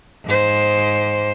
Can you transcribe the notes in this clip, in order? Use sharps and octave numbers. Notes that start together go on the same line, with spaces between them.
G#2 C5